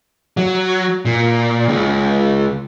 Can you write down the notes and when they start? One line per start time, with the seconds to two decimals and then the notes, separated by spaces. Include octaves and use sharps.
0.37 F#3
1.05 A#2
1.68 C#2